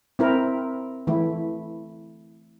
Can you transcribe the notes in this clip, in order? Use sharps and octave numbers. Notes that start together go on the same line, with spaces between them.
C4 E4 A#4
E3 A3 E4